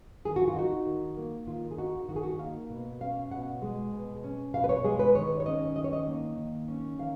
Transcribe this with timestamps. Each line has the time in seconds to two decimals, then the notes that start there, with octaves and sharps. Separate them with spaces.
0.25 D#3 G#4
0.36 F#4
0.48 F4
0.56 D#4 F#4
0.87 D#3
1.17 A#3
1.47 D#3 F4
1.71 G#4
1.78 D#4 F#4
2.09 D#3 F#4
2.16 G#4
2.23 F#4
2.39 A#3 F5
2.70 B2
3.01 C#4 F5
3.31 B2 F#5
3.62 G#3
3.92 B2
4.24 C#4
4.54 B2 F5
4.64 B4
4.69 C#5
4.84 G#3 G#4
4.99 B4
5.15 D#3 C#5
5.40 C#5
5.46 C#4 D#5
5.76 D#3 D#5
5.84 C#5
5.93 D#5
6.07 A#3
6.37 D#3
6.68 C#4
6.99 D#3 F5